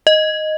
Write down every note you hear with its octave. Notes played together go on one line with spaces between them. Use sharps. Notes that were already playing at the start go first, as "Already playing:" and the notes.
D#5